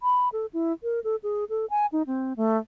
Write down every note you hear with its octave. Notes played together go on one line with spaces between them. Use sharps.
B5
A4
E4
A#4
A4
G#4
A4
G#5
D#4
C4
A3